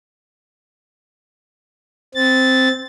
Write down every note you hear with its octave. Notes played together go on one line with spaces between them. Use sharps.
C4 A6